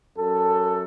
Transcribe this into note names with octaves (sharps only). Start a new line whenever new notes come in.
F#2 A4